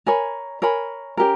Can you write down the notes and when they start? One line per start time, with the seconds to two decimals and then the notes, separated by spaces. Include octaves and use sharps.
0.06 A#4 C#5 G#5 B5
0.62 A#4 C#5 G#5 B5
1.17 C#4 G4 A#4